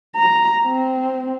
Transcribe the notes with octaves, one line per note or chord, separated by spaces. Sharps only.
A#5
C4